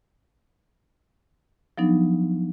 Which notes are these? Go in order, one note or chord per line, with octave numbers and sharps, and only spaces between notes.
F3 F#3 B3 D4 D#4